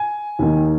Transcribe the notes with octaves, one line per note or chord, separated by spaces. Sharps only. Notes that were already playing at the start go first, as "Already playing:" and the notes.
Already playing: G#5
D#2 D#3